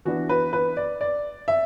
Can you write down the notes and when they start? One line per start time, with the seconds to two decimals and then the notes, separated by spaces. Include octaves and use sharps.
0.05 E3 B3 D4 F#4
0.29 B4
0.53 B4
0.77 D5
1.01 D5
1.48 E5